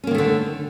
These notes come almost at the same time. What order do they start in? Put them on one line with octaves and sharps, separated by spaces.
C#4 A#3 D#3 A3 D3